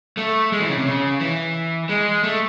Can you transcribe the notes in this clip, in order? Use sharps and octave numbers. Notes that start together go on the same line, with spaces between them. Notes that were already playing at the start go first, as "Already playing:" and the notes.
A3
G#3
E3
C#3
C3
C#3
E3
G#3
A3